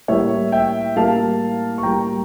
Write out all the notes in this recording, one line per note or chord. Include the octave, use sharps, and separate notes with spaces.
A2 G3 A#3 C#5 E5
E5 G5
A2 G3 A#3 F5 A5
C#6
A2 G3 A#3 G5 A#5